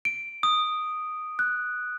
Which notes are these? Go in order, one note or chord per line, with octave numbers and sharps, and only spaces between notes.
D7
D#6
F#6